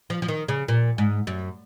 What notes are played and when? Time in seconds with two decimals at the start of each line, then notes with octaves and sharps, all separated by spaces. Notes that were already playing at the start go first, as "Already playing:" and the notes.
0.10 F3
0.22 F3
0.28 D#3
0.48 C#3
0.68 A#2
0.98 G#2
1.27 F#2